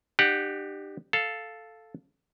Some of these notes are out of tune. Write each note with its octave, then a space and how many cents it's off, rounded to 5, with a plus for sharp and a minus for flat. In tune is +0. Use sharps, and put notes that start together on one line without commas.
D4 +45 G4 +0 F#5 +0
A4 +0 F5 +0